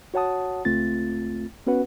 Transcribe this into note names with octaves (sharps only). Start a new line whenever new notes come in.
F#4 C#5 F#5 A5 D#6
C#2 A3 C4 F4 A6
B3 C#4 F#4 B4 F#5